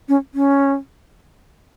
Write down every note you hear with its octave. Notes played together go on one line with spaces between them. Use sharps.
C#4
C#4